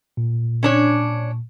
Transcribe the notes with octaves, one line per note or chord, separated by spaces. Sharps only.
A#2
C#4 D4 C#5